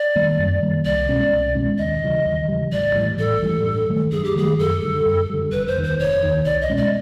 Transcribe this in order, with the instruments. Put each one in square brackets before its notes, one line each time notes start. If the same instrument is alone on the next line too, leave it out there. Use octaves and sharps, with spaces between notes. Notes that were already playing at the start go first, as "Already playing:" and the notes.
Already playing: [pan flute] D5
[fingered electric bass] D#3 G3 A#3
F#2
D#3 G3 A#3
[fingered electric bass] C2 [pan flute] D5
[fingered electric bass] B2 G#3 C#4
C2
B2 G#3 C#4
[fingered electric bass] D#2 [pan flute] D#5
[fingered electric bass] C#3 E3 G3
D#2
C#3 E3 G3
[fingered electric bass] A1 [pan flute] D5
[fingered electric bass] A2 E3 G3
[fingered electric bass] A1 [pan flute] A4
[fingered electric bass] A2 E3 G3
G2
D#3 F#3 A3
[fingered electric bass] G2 [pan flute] G#4
[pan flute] G4
[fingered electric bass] D#3 F#3 A3 [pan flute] G#4
[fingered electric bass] F#2 [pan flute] A4
[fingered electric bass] D3 G3
F#2
D3 G3
[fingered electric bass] F1 [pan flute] B4
[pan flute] C5
[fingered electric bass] D#2 D#3
[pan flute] C5
[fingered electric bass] F1 [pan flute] C#5
[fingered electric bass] D#2 D#3
[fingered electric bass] C2 [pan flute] D5
[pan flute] D#5
[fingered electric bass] B2 G#3 C#4
[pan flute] D5